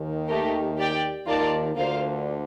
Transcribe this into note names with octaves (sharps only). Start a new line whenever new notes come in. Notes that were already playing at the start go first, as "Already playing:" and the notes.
Already playing: D#2 D#3
A3 D#4 G4 A#4
G4 D5 G5
D#2 D#3 F4 A#4 D5 A5
D2 D3 A#3 F4 C5 F5